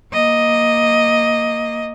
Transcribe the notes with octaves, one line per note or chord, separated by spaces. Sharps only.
A#3 D#5